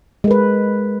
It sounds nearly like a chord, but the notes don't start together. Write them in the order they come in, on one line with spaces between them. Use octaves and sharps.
G#3 A#4 B4